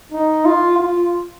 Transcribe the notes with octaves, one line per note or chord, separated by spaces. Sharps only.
D#4
F4
F4